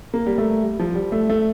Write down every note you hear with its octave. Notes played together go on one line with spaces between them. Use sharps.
A#3
G3
A3
G3
F3
G3
A3
A3